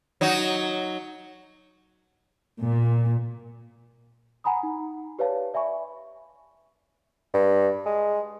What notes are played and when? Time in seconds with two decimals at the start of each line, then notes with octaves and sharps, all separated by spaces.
0.21 F#3 D#4 F#4
2.64 A#2
4.44 F#5 G#5 A#5 B5 D#6
4.63 D#4
5.19 G4 B4 C#5 D5 F5 A5
5.54 D5 E5 G#5 B5 C#6
7.34 G2
7.86 G#3